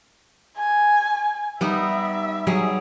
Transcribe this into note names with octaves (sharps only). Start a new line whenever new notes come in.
G#5
G3 B3 D#4 E5
F#3 G3 G#4